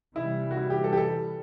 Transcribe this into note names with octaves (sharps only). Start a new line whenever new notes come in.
C3 E3 G3 E4
F#4
E4
G4
A4
G4
A4